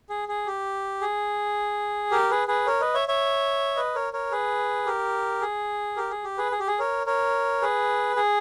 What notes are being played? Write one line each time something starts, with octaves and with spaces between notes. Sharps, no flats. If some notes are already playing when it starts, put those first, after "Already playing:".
G#4
G#4
G4
G#4
G4 A#4
G#4 B4
G#4 B4
A#4 C#5
B4 D#5
C#5 E5
C#5 E5
B4 D#5
A#4 C#5
A#4 C#5
G#4 B4
G4 A#4
G#4
G4 A#4
G#4
G4
G#4 B4
G#4
G4
G#4
A#4 C#5
A#4 C#5
G#4 B4
G#4